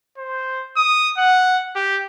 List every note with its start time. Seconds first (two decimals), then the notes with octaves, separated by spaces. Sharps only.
0.18 C5
0.76 D#6
1.18 F#5
1.76 G4